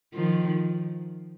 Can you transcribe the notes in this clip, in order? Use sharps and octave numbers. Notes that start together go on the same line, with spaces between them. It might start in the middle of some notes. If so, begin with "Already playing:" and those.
D#3 F3